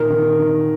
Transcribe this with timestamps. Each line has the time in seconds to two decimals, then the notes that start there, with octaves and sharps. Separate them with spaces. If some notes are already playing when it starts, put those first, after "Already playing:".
Already playing: A#2 D#3 A#4
0.10 D#3
0.39 D#3